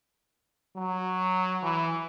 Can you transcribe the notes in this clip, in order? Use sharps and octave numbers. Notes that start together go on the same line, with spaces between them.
F#3
E3